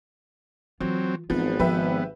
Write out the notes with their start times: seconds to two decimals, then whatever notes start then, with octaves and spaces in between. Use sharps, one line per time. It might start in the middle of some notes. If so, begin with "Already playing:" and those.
0.81 E3 F#3 C4 F4
1.30 G#1 E3 F3 B3 C4
1.59 F3 G4 B4 E5